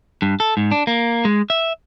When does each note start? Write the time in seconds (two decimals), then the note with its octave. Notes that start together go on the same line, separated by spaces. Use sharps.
0.22 G2
0.40 A4
0.57 G#2
0.71 D4
0.87 A#3
1.25 G#3
1.50 E5